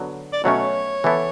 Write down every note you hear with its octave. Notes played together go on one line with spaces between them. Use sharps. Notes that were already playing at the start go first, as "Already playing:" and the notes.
Already playing: D3 F#3 B3
D5
B2 F#3 A3 C#4 C#5
E3 B3 E4 A4